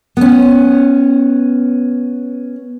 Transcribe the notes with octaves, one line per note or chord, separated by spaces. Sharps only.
B3 C#4